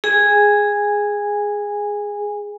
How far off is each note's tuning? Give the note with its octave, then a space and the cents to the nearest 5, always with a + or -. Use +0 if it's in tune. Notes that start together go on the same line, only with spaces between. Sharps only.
G#4 -5 G#5 -20